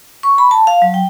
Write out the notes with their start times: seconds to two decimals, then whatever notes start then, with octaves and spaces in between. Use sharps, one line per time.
0.23 C#6
0.38 B5
0.51 A5
0.67 F5
0.82 F#3
0.94 G5